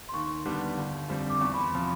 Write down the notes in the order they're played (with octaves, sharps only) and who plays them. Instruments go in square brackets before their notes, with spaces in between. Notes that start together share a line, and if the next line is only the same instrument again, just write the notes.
[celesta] C6
[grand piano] D#2 [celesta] C#6
[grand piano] D3 G3 B3 D4
G1
F2 D3 G3 C4
[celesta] D6
[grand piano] E2 [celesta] C#6
[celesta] B5
C6
[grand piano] C3 F3